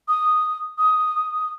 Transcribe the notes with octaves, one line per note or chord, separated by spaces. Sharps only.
D#6
D#6